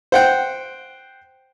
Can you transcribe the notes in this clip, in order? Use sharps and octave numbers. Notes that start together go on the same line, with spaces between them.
C5 F#5 G5